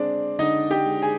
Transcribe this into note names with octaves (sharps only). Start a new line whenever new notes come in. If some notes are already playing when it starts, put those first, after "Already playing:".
Already playing: D3 G#3 C4 D4 C5 D5
D3 D#4 D#5
G4 G5
G#3
G#4 G#5